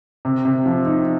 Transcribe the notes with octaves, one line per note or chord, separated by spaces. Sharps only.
C3
C3
F3
D#4